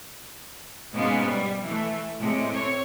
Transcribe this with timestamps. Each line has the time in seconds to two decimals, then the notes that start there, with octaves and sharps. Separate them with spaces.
0.93 G#2 B2 G#3 A#3 B3 C#4
1.29 G3
1.63 E3 A3
2.17 A2 C3 G#3
2.54 C4 C#5